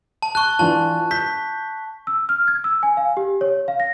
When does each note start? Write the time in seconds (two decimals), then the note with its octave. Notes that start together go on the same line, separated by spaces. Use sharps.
0.22 A5
0.35 A5 C#6 F#6
0.59 E3 D4 F4 A5
1.11 G6 B6
2.07 E6
2.29 F6
2.48 G#6
2.64 E6
2.83 G#5
2.97 F5
3.17 G4
3.41 C#5
3.68 F5
3.80 A#6